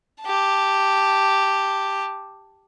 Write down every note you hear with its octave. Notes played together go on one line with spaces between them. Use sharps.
G4 A5